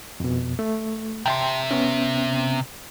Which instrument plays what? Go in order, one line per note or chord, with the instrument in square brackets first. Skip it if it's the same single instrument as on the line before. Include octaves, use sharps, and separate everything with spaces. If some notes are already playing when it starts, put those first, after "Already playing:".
[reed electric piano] F2 B2
A3
[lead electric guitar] C3 E5 [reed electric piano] G5 A5 C6
[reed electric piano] B3 C#4